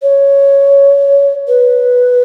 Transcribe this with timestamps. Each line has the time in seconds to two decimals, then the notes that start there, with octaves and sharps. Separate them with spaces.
0.02 C#5
1.48 B4